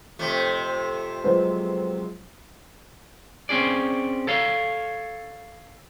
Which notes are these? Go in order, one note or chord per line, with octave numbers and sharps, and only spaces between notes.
F2 C3 A3
F3 F#3 G#3 B4 C5
C4 C#4 G#4 D5
A4 C#5 F5